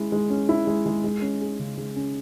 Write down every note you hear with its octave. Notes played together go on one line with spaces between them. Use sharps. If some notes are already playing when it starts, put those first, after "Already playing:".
Already playing: G#3 C#4 E4
G#3
C#4
E4
G#3
G#3
G#3
C#4
G#4
C#3
G#3
C#4